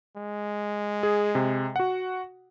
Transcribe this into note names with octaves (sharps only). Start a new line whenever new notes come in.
G#3
G#4
C3
F#4 F#5